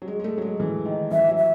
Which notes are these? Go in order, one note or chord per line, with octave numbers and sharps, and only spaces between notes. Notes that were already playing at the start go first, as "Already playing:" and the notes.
F#3
G#3
G#3
A3
F#3
G#3
E3
D#3
E3 E5
F#3
E5